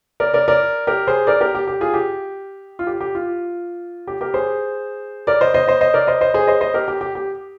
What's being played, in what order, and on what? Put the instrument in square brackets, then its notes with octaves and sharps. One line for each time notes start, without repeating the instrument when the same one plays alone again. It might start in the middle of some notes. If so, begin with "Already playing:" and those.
[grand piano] A#4 D5
A#4 D5
A#4 D5
G4 A#4
G#4 C5
A#4 D5
G4 A#4
G4
G4
F4 G#4
G4
F4
G4
G4
F4
G4
G4 A#4
G#4 C5
A#4 D5
C5 D#5
C5 D#5
C5 D#5
C5 D#5
A#4 D5
C5 D#5
C5 D#5
G#4 C5
C5 D#5
C5 D#5
G4 A#4
G4
G4
G4